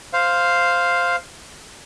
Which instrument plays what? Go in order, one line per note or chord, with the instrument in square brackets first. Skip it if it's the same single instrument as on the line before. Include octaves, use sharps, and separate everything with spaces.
[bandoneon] C5 F5